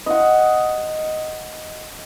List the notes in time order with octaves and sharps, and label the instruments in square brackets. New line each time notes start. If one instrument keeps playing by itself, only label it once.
[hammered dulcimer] D#5 F#5